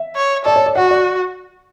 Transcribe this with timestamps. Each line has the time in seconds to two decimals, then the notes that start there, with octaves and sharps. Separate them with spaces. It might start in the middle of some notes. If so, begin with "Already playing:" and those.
Already playing: E5
0.16 C#5
0.45 A4 D5
0.56 C#5
0.66 D5
0.76 F#4 F#5
0.91 D5